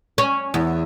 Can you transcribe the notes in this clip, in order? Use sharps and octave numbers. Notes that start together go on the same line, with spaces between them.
C#4
E2